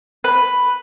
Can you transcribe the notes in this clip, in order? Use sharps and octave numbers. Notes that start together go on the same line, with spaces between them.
B4